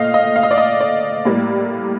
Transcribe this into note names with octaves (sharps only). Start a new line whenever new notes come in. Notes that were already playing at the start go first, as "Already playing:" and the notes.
Already playing: A#2 A3 D#5 F5
D#5
F5
D#5
D5
D#5
D5
A2 G3 A#3